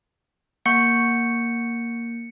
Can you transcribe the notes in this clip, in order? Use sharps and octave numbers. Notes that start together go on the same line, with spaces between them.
A#3 F#5 C#6 G6 C#7